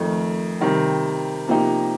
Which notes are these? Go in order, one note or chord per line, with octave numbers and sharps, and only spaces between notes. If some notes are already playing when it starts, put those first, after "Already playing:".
Already playing: F2 D#3 A3
C3 D#3 G3
C3 F3 A#3 D#4 G4